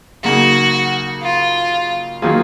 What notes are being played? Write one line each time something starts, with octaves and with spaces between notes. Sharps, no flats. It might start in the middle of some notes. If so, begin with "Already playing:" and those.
C#3 F#3 A#3 D#4 F#4 G#4
F4
D#3 F#3 A#3 F4 G#4